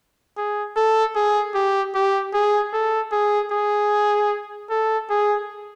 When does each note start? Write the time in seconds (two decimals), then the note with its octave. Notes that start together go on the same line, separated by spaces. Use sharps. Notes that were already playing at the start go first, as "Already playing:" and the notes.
0.37 G#4
0.76 A4
1.16 G#4
1.54 G4
1.95 G4
2.34 G#4
2.73 A4
3.12 G#4
3.51 G#4
4.70 A4
5.10 G#4